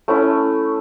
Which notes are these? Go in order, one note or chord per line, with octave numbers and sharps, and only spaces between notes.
A3 C#4 E4